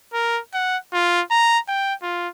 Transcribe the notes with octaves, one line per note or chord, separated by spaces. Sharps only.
A#4
F#5
F4
A#5
G5
F4